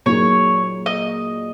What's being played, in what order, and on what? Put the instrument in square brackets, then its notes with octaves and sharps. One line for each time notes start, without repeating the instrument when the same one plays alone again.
[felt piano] A#2 F#3 A#3 D#4 G#4 [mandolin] C#5
[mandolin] D#5